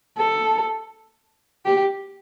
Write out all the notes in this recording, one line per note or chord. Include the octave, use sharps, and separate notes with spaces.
A4
G4